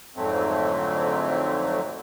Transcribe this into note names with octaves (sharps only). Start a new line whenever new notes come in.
F2 G#2 D3 F#3 A3 C4